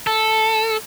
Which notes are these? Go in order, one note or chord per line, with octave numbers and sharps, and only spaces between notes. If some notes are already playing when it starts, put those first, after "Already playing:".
A4